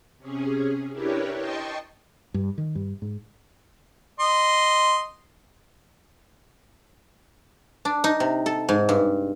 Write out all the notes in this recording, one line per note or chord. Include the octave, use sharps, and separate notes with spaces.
C3 C#4 G#4
D4 E4 G4 A#4 B4 C#5
D#5 G5 A5 C6 C#6
G2
D#3
G2
G#2
D#5 C6
D4
D#4
C3
A4
G#2
G2